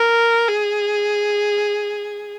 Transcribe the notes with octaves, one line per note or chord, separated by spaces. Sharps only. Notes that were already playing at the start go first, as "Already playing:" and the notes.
Already playing: A#4
G#4